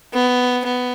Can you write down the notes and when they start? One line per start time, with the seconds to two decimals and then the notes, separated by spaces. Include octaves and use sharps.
0.13 B3
0.64 B3